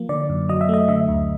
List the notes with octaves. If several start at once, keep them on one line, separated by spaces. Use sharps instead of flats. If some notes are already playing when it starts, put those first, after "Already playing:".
Already playing: F3 A#3
D3 D5
F#2
F#3 D#5
E5
A3 D#5
D3 E5
D2